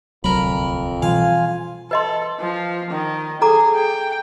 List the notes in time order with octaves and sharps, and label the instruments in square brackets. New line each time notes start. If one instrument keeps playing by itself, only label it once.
[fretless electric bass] D1 C2 F#3 [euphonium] F2 [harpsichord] A#4 B5
[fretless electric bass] B2 E3 G3 [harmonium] F4 G#5 [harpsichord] F5
[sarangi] A4 [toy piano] B4 D#5 C6
[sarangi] F3
D#3
[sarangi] G#4 [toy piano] A4 A#5 D6
[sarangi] G5